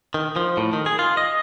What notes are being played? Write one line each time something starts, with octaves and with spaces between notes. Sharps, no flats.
D#3
F3
A2
D#3
G#4
F4
D#5